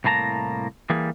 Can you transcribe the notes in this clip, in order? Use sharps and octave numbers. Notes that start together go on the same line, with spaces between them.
C2 A2 A#3 A5 A#5
E3 G3 A#3 G#4